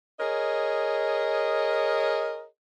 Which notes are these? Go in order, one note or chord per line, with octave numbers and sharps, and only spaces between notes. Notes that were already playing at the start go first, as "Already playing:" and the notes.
G#4 A#4 C#5 D#5